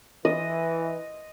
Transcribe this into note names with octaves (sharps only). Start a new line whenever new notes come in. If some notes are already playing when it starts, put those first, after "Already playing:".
E3 D#5